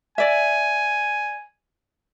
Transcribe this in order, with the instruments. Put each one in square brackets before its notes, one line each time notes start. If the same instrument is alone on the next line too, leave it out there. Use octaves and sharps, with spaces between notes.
[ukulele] D5 E5 [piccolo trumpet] G#5